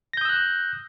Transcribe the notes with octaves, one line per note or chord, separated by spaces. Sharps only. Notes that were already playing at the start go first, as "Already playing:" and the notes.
D#6 E6 F#6 G6 A#6